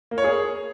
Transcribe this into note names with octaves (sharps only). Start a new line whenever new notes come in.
A#3
C#5
G#4